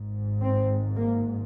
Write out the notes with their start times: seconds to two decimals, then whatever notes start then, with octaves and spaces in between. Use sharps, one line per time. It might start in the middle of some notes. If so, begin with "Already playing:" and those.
Already playing: G#1 G#2
0.41 C4
0.97 A#3